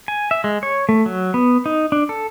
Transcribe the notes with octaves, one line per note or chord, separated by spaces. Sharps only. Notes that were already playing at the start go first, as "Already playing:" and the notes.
G#5
E5
G#3
C#5
A3
F#3
B3
D#4
D4
A4